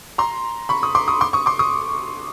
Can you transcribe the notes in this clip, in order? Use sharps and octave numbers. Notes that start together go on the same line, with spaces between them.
A#5 C6
B5 C#6
C#6 D#6
C6 D6
C#6 D#6
C6 D6
C#6 D#6
C6 D6
C#6 D#6